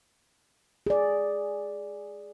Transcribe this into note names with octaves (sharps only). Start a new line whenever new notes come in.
G#4 D5